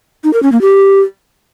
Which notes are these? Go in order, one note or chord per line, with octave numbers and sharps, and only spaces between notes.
D#4
A#4
C#4
A#3
G4